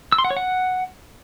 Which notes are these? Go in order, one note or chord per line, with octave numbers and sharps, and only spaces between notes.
E6
C6
F#5
C#5
F#5